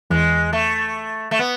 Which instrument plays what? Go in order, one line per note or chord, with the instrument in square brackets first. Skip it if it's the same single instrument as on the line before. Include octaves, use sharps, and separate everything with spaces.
[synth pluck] E2 E3 [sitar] G#3
[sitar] A3
A3
B3